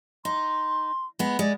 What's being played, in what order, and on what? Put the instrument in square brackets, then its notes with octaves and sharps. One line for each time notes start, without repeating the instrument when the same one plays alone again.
[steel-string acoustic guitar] D#4 [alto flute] C6
[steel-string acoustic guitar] G#3 B3
[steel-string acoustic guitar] G#3 [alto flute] D5